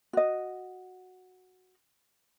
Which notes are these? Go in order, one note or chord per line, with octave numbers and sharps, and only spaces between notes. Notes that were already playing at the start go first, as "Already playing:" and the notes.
F#4 D#5